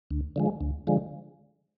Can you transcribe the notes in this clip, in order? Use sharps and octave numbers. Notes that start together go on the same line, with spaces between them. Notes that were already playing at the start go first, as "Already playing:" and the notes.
D2
D3 F3 G#3
D2
D3 F3 G#3